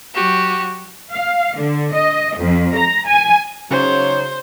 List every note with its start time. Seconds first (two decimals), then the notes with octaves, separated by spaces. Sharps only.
0.14 F#3 F#4 G4 C#6
1.12 F5
1.57 D3
1.93 D#5
2.38 F2
2.76 A#5
3.08 G#5
3.71 C#3 F#3 D#4 C5 C#5